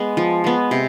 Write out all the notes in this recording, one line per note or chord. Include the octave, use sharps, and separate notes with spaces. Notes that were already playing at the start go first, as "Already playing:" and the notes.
Already playing: G#3 B3
F3
G#3 B3
C3